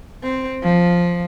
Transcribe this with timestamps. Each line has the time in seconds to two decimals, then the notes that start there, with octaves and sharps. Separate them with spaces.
0.22 C4
0.61 F3